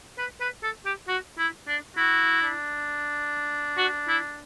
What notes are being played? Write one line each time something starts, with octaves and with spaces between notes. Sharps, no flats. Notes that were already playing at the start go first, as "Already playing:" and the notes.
B4
B4
A4
G4
F#4
E4
D4
E4 F#4
D4
F#4
E4